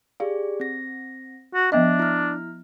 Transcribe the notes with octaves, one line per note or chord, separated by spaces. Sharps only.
G4 G#4 D5 F5
C4 A#6
F#4
F3 B3 D4 D#5 E5
E4 F6